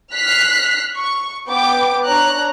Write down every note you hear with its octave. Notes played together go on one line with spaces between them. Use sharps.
F6 F#6 B6 C7
C#6
B3 G5 D6
D4 C#5 A#5 F#6